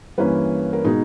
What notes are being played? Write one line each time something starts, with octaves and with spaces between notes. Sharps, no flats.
G2 E3 A#3 C#4 B4
A#4
B2 G#3 D#4 G#4